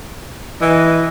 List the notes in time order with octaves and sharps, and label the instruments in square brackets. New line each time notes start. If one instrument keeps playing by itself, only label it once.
[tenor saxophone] E3 [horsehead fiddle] D#5